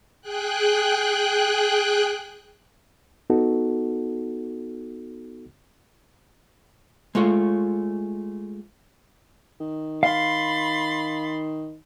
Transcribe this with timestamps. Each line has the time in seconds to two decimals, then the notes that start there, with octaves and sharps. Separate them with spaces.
0.21 G#4 G5 F#6
3.30 B3 D#4 F#4 A4
7.15 G#3 A3 F4 C#5
9.60 D#3
10.03 F5 B5 C6 A6